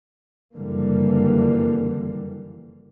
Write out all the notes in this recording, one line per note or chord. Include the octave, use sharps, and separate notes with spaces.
F#1 F2 D3 E3 G3 A#3